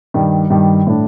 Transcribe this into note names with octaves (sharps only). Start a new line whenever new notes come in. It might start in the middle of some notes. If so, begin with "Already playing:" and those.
G2 D#3 G3
G2 D#3 G3
A2 A3 D4